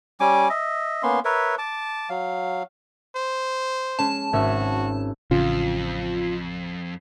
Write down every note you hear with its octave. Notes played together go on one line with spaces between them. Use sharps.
G3 C#4 G#5 D6
D#5 E5
A#3 B3 C#4 C6
A#4 B4 C#5 E5
A5 D6
F#3 F5
C5
G#3 C#4 A5
G#1 C#4 F#4 E5
A1 F2 C#3 F4